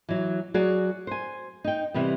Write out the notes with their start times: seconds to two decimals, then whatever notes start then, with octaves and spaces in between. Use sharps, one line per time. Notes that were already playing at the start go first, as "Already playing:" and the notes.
0.09 E3 F#3
0.54 F#3 F#4 G#4 D5
1.07 C5 G#5
1.64 D#4 G5
1.94 C3 E3 G3 B3